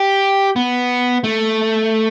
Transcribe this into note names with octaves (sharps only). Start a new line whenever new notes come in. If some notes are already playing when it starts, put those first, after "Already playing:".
Already playing: G4
B3
A3